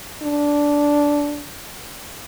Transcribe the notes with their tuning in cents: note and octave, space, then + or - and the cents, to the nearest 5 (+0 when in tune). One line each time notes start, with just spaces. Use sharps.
D4 -10